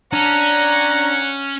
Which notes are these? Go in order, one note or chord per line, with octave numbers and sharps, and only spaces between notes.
C#4 D4 F#5 A#5